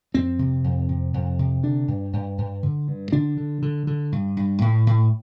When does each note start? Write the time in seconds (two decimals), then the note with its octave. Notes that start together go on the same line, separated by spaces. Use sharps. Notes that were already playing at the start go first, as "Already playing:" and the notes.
0.14 F2 C4
0.39 C3
0.64 F2
0.89 C3
1.14 F2
1.39 C3
1.63 D3 D4
1.88 G2
2.13 G2
2.38 G2
2.63 D3
2.88 G2
3.12 D3 D4
3.37 D3
3.62 D3
3.87 D3
4.12 G2
4.37 G2
4.62 A2
4.87 A2